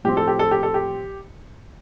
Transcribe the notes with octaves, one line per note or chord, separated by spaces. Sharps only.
A2 F3 C4 G4
A4
G4
A4
G4
A4
G4